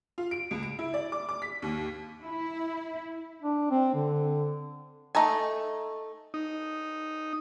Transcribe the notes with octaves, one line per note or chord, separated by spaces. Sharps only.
F4
D7
C#2
D7
E4
D5
D6
D6
B6
D#2
E4
D4
C4
D3
A3 D#4 A4 G#5
D#4